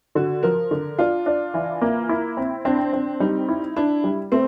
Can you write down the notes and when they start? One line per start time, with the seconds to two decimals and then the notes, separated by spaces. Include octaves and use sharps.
0.15 D3 F#4
0.43 F3 A#4
0.71 D3
0.99 D4 F4
1.26 D4
1.54 E3
1.81 A#3
2.09 E4
2.37 C4
2.65 C4 D4
2.93 C4
3.20 G3 D#4
3.49 E4
3.76 D4 E4
4.04 G3
4.32 A3 C4